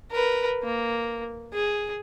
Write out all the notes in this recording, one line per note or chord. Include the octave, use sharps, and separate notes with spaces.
A#4 B4
A#3
G#4